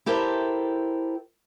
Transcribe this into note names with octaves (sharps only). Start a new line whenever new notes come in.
E4 G4 A4 A#4 C5 E5